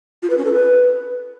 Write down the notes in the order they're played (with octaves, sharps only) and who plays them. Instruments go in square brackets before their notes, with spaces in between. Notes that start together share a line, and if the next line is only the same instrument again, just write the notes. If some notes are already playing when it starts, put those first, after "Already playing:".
[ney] F4
B4
C#4
A4
B4